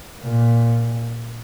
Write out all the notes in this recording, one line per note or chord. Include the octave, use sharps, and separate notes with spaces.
A#2